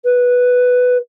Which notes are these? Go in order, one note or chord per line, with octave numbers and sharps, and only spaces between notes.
B4